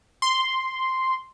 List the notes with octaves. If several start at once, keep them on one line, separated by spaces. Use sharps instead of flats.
C6